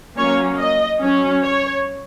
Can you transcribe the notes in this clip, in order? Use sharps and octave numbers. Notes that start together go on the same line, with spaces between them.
F#3 A#3 C#4 C#5
D#5
F#3 C#4
C#5